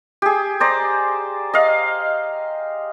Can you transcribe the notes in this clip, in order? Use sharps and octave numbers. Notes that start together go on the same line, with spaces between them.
G4 G#4
C5 D5 A#5
D#5 F5